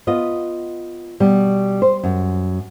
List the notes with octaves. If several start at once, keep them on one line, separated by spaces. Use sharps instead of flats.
B3 F4 D#5
B2 G3
C5
F#2